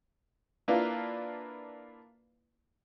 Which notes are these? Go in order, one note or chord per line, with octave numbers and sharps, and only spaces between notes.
A#3 D4 E4 F4 B4 D5